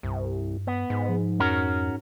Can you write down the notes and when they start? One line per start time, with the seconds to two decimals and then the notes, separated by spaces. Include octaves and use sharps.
0.03 C2 G2
0.67 B3
0.90 G#2
1.09 F3
1.40 F2 C#4 F#4 A#4